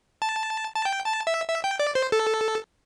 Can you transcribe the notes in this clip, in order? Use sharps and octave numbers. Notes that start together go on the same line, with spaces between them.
A5
A5
G5
A5
E5
E5
G5
D5
C5
A4